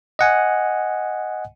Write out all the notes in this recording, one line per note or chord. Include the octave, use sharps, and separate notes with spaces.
D#5 F#5 G#5